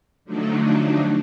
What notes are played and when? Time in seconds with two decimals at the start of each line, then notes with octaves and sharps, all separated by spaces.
0.25 D3 F3 F#3 A3 D4 D#4